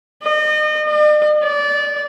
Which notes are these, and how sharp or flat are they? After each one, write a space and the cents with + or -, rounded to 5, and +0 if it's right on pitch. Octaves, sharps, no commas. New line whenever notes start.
D#5 -35
D5 +45
D5 -20